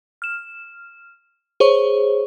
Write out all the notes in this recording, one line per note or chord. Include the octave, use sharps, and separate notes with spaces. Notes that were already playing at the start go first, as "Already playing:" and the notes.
F6 E7
G#4 C5 C#5 C#6